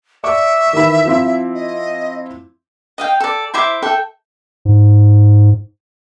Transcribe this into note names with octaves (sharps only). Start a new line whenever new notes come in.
D5 E5 C#6 D6
D#3 E3 B5
F3 C4 E4
D#5
D#5 F5 G5
A4 D5
E4 C5 E5 D6
A4 E5 G5
G#2